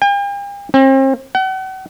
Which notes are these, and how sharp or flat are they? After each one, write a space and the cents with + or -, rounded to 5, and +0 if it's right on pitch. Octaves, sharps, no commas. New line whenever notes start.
G5 +45
C4 +40
F#5 +40